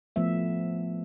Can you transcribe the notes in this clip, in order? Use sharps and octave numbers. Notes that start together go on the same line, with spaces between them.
F3 A3 B3 E5